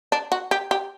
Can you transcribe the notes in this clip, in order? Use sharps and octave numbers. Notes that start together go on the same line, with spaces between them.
D4
F#4
G4
G4